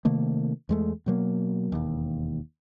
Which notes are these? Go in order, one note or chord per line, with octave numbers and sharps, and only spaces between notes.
C3 D#3 A3 A#3
E2 G#3 A3
B2 F#3 A#3
E1 D#2